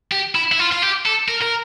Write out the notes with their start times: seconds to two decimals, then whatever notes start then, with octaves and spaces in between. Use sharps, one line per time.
0.12 G4
0.35 E4
0.52 E4
0.59 F4
0.72 F4
0.82 G4
1.06 A4
1.28 A#4
1.42 A#4